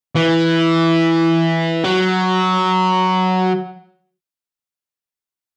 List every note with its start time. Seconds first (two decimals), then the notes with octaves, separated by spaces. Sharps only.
0.16 E3
1.84 F#3